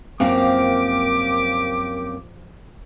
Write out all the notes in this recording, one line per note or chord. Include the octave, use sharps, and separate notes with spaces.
F#2 F3 A#3 C4 G4 F5 G5 D6